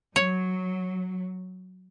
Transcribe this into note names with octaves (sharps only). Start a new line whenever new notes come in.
F#3 C#5